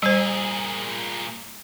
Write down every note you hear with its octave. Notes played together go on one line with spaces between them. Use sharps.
A#2 G3 G#4 C5